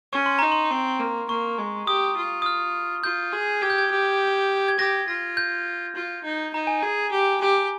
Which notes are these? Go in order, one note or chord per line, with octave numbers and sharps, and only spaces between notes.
C#4 C#6
C6
D#4 A#5
C6
C4
A#3
A#3 C#6
G#3
G4 D#6
F4
D#6
F6
F4 G6
G#4
G4 G#6
G6
G#6
G4
G#6
G4 A#6
F4 A#6
G6
F4
D#4
D#4 A#5
G#5
G#4 A#5
G4
G4